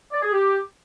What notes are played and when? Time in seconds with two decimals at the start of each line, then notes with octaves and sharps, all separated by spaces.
0.12 D5
0.22 G#4
0.32 G4